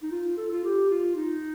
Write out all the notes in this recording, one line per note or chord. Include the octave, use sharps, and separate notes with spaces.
D#4
F4
A4
F4
G4
F4
D#4